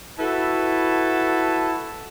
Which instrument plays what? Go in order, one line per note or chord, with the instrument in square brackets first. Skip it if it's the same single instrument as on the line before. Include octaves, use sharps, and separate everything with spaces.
[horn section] E4 F#4 A4 B4 A5